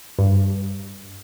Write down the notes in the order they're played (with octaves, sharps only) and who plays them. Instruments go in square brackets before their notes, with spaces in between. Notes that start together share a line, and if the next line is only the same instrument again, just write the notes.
[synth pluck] G2